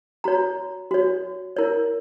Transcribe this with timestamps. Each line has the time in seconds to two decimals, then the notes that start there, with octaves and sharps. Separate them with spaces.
0.24 F#4 C#5 A#5
0.91 F#4 C#5
1.56 E4 A#4 C#5